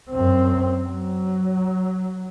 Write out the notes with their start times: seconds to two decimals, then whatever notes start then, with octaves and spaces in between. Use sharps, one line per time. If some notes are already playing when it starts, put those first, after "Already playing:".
0.10 F#2 C4
0.83 F#3